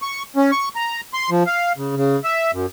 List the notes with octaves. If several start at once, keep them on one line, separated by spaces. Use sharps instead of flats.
C#6
C#4
C#6
A#5
C6
F3
F5
C#3
C#3
E5
F#2